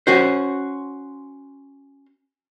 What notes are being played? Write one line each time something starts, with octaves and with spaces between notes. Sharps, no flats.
C#4 F#4 C5